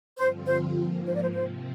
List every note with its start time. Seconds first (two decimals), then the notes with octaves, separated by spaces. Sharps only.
0.17 G2 D3 F3 C4 F4 C5
0.47 C5
0.76 G#2 F3 A#3
1.05 C5
1.13 D5
1.22 C5
1.33 C3 F3 C4 C5